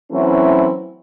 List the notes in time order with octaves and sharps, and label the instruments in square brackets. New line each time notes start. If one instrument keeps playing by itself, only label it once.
[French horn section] E3 F#3 A3 C4 C#4 E4